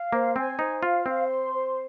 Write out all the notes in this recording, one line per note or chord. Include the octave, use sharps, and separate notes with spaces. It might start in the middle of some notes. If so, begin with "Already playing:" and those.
Already playing: F5
A#3 C5
C4 G#5
D#4 C5
F4 F5
C4 C5
C6
C5